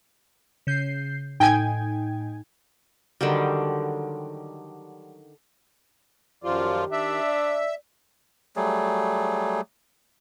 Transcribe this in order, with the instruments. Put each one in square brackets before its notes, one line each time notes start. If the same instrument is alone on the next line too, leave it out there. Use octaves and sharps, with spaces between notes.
[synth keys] C#3 G6 C7
[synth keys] A2 D#4 [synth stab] G5 G#5 G#6
[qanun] D3 D#3 F#3 G3
[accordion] F#2 F3 F4 [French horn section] D#3 G4 [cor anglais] D5
[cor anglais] D4 [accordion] E5
[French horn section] D5
[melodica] F#3 G3 A3 G#4